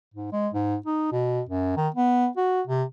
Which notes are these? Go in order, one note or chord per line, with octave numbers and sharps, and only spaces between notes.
G#2
G#3
G#2
D#4
B2
F#2
D#3
B3
F#4
C3